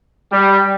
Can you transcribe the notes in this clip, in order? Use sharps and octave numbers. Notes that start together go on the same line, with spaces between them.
G3